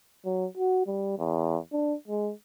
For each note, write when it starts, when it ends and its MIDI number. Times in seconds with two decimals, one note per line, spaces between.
0.25 0.46 54
0.57 0.86 66
0.87 1.15 55
1.18 1.57 40
1.73 1.94 62
2.08 2.32 56